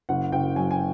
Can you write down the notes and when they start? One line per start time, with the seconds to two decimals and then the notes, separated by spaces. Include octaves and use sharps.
0.09 F#1 F#5
0.32 F#1 G5
0.56 F#3 G#5
0.71 G#5